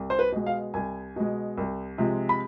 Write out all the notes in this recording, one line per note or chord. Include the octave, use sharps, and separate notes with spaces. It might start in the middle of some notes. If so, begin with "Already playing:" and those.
Already playing: C2
C5
B4
B2 G#3
F5
C2 G#5
B2 G#3
C2
C3 F3 G#3
B5